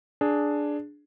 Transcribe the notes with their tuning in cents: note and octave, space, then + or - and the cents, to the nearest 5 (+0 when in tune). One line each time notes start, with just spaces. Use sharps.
D4 +0 G#4 +10